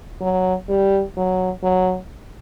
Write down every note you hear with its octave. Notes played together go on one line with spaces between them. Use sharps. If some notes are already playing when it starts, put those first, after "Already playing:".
F#3
G3
F#3
F#3